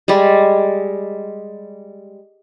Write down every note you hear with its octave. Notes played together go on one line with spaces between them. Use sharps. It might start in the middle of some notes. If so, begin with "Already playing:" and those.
G3 G#3